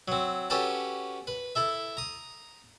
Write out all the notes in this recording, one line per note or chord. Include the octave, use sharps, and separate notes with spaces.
F#3 C4
C#4 F#4 G4 A4 B4 A5
B4
E4 A4 E5
A#5 D#6